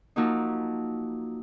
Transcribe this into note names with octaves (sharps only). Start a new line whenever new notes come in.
F3 F#3 A#3 D#4